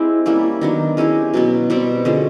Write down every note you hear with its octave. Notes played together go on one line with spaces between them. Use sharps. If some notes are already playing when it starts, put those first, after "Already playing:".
Already playing: G#3 C4 E4 G4
G3 A#3 C#4 E4
D#3 F#3 B3 D4
G#3 C#4 E4 G4
B2 F#3 B3
B2 G3 C4
D3 F3 G#3 C#4